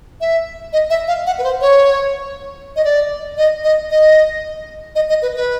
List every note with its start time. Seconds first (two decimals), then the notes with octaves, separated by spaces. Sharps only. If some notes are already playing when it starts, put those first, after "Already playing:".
0.21 E5
0.73 D#5
0.90 E5
1.08 F5
1.26 F#5
1.38 B4
1.44 C5
1.61 C#5
2.76 D#5
2.84 D5
3.37 D#5
3.64 D#5
3.90 D#5
4.95 D#5
5.09 D#5
5.22 B4
5.36 B4